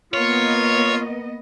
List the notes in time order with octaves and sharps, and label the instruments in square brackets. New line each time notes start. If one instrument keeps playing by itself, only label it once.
[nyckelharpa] A#3 [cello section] B3 D#5 [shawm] F4 [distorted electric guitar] C#5